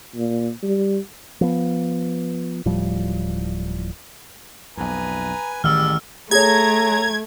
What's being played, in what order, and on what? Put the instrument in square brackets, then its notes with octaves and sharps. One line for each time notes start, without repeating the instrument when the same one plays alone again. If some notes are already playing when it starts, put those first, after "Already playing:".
[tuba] A#2
G3
[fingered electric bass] F3 B3
D1 A2 F3 G3
[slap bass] B1 F2 [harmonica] B4 G#5 A#5
[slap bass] A1 [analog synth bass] D#3 [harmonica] G3 G#3 [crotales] E6 F6
[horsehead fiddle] A3 [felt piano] G#4 C#5 [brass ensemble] A#5 [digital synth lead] G#6